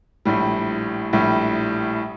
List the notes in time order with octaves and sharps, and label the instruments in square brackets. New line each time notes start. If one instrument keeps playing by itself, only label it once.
[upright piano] A#1 A2 G3
A#1 A2 G3